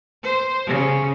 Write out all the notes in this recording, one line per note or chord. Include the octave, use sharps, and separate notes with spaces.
C5
C#3